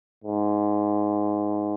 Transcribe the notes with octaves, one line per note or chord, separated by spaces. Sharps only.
G#2